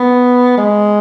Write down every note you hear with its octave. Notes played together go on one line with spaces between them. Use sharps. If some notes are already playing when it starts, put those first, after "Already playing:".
Already playing: B3
G#3